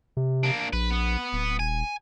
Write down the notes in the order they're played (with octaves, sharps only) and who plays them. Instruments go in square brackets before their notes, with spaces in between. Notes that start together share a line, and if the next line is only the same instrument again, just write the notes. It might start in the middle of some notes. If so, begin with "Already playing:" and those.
[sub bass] C3
[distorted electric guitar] A#3 D4
[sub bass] A#1 [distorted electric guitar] B4
[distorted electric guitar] B3
[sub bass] D1
[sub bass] D#1 [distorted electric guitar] G#5